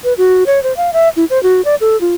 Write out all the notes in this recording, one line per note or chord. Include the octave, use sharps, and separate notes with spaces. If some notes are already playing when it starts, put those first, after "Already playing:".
B4
F#4
C#5
C5
F5
E5
E4
C5
F#4
D5
A4
F4